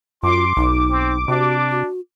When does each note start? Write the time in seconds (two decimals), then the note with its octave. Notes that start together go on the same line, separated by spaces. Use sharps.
0.23 F#2 F4 C6 D6
0.57 B1 D#4
0.90 C4
1.28 C3 D4 F#4
1.71 F#4